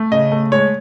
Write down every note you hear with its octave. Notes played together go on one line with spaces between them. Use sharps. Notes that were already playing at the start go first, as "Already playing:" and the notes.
Already playing: A3
C#3 D#5
A3
G#3 C#5